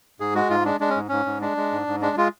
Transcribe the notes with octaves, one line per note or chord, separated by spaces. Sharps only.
G#2 G#4
G#3 F#4
G#2 F4
G#3 D4
G#3 D4
C#4
G#2
G#2 C#4
G#2
G#3 D4
G#3
G#2
G#2
G#3 D4
G#3 F4